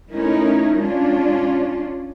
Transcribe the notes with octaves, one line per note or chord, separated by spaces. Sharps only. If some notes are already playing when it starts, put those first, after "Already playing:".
A3 C#4 D#4 E4 A#4
G#3 C#4 D4 F4